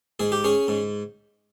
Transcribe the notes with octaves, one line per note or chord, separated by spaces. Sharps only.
G#2 G#4
G4
C#4 G#4
G#2